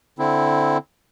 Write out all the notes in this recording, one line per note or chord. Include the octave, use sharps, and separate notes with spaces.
D3 C4 E4